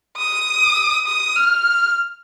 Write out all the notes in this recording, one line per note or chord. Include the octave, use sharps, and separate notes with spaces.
D#6
D#6
F6